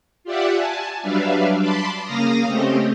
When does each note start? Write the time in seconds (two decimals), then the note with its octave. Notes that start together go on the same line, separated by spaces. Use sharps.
0.24 F4 G4 D5 E5 F#5
0.55 G#5 A5
1.02 F#3 G3 D4 B4 E5 F5
1.58 A5 B5 C6 D6
2.04 C#3 A#3 F5 A#5 D#6 A#6
2.47 A3 C4 C#4 G4 D#5